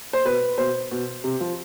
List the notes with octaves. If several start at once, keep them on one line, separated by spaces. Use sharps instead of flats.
C5
B2 B4
B2 C5
B2
C3
F3